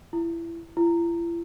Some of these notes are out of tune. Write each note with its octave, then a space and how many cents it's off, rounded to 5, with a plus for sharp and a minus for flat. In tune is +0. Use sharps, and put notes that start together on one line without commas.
E4 +25
E4 +45